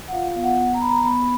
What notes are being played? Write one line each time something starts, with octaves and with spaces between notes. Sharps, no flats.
F#5
F4 F5
B3 F5
F#5
B3
A#5
B3 B5
A#5
B3 B5